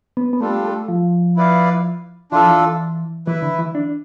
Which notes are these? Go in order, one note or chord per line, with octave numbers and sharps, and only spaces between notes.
B3
B3
G3 A3 D4 F4 A4
A3
F3
E4 B4 D5 F5
E3 D4 F4 A4
F3
E3
E3 E4 B4 E5
D3
E3
D4